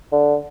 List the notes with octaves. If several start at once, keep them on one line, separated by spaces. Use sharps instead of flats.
D3